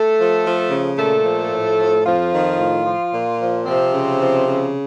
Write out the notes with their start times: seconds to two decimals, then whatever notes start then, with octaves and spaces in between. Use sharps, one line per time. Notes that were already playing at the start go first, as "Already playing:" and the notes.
Already playing: A3 A4
0.18 F3
0.45 F3
0.71 C#3
0.97 A#2 A3 A4
1.24 F3
1.51 A2
1.78 F3
2.05 F2 F3 F4
2.32 D#3
2.59 A2
2.85 F3
3.14 A#2
3.40 F3
3.66 C3 F3 C4
3.93 C#3
4.20 F3
4.48 C#3